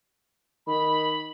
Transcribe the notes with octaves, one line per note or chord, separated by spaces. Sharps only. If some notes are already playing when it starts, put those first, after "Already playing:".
D#3 B5